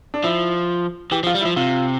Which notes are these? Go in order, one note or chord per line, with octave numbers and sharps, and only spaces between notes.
D4
F3 E4
E3 G4
F3
F4
G3
E4
F3
C3 F4